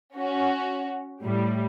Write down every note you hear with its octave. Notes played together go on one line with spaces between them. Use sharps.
C#4 F#4
A2 G3